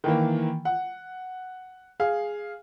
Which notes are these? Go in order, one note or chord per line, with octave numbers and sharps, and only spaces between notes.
D#3 E3 A#3
F#5
G#4 F5